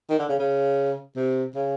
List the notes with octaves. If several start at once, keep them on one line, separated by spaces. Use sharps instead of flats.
D#3
D3
C#3
C#3
C3
C#3